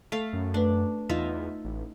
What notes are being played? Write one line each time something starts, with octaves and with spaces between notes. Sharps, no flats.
A3 A4 F5
F#2
A3 D4 B4
E2 D#4 F4 E5
A1